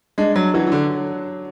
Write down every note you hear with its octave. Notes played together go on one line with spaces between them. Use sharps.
G#3 D4
F#3
E3 F#3
E3
D3